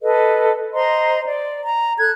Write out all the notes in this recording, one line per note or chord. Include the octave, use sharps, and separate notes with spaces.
A4 B4 D#5
C5 D#5 A#5 C6
D5
A#5
A4 F#6 G#6